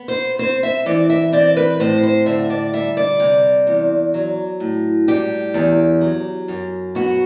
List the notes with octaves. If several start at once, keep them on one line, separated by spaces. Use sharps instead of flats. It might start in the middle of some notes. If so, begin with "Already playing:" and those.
Already playing: B3
C5
C4 C5
E5
E3 D5
E5
C4 D5
B4
A2 C5
C5
D3 E5
D5
G3 E5
D5
C3
E2
F#3
A2
G3 G4
E2
F#3
F#2
B3 F#4